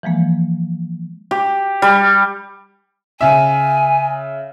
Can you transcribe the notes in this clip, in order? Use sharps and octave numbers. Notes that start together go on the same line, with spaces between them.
E3 F3 G#3 A#3
G4
G3
C#3 E5 G#5